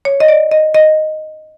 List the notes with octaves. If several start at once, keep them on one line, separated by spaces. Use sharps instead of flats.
C#5
D#5
D5
D#5
D#5